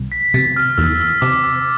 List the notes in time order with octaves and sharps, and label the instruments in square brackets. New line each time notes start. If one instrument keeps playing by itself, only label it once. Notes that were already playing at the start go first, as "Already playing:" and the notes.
Already playing: [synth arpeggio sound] C2
[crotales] B6
[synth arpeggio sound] C3 [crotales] A6
[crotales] F6
F6
[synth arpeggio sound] E2 [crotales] E6
[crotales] E6
[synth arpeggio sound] C3 [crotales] D6
[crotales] E6